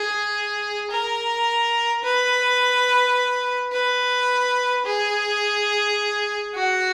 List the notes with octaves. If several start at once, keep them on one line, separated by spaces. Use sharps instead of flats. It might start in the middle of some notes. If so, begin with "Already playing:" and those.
Already playing: G#4
A#4
B4
B4
G#4
F#4